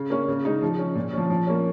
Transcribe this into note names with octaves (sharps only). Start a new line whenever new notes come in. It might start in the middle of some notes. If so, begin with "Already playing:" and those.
Already playing: C#3
A#3 C#4
C#3
G#3 D#4
F3
C#4
A#2
C#4
F3
F3
A#3 C#4